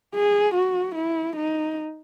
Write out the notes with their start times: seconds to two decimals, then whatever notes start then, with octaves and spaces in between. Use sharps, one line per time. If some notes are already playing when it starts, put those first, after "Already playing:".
0.15 G#4
0.55 F#4
0.95 E4
1.36 D#4